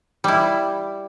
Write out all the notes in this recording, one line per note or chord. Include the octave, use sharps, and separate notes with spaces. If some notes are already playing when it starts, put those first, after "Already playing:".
G3 E4